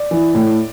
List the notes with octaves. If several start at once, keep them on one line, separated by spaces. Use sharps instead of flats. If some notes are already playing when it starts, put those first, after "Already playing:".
Already playing: D5
E3
A2